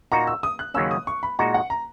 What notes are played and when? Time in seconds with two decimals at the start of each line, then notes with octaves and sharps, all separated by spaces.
0.12 A#2 A#3 D#4 F#4 A#5
0.27 E6
0.43 D#6
0.59 F#6
0.74 D#2 C#3 F#3 A#3 C#4 E6
0.91 D#6
1.07 C#6
1.23 B5
1.39 A#2 G#3 D#4 F#4 A#5
1.54 F#5
1.70 A#5